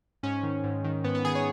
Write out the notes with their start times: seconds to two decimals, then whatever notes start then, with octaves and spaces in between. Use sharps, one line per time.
0.23 G#2 C#4
0.43 D#3
0.64 G#2
0.84 D#3
1.04 G#2 B3
1.15 B3
1.25 D#3 G#4
1.35 C#5